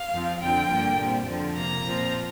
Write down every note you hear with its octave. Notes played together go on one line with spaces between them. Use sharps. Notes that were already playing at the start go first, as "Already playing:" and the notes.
Already playing: F5
F2 F3 C4
F2 D3 F3 C4 G5
G2 D3 A#3
A#2 G3 C4
F2 D3 F3
C3 A#3 A#5
A#2 F3 C4